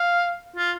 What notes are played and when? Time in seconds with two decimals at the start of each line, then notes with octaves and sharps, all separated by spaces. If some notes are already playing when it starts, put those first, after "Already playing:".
Already playing: F5
0.56 F4